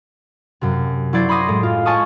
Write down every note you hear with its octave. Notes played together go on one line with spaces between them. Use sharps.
F#2 C3
F#3 E4 C5 D5 G#6
B5 C6 D6 D#6 A#6
A2 G#3
F4
C#5 G#5 A5 C#6 D#6 F6